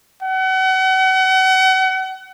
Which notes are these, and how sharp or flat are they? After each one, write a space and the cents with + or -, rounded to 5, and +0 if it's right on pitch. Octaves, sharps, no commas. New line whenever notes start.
F#5 +35